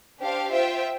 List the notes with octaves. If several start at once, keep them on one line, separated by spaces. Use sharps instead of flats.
D4 G4 C5 F5
F4 C5 E5 G5